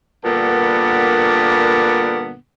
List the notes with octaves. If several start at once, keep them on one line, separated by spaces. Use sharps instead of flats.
G2 A#2 D3 A#3 B3